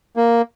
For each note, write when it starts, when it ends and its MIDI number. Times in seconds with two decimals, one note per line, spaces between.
0.16 0.42 58